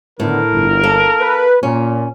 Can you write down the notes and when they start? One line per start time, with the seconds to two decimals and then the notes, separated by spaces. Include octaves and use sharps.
0.20 A2 D3 D#3 B3 A#4
0.52 G1
0.84 A#3 A4
1.21 B4
1.63 A#2 C#4